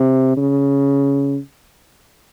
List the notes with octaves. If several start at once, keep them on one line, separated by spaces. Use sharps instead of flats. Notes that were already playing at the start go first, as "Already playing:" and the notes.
Already playing: C3
C#3